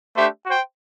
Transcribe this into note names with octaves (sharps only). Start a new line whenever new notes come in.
A3 D4 G4 C5 E5
F#4 C5 G5